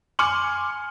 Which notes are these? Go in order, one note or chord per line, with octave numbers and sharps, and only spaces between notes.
G#5 C6 D6 F6 C#7 F#7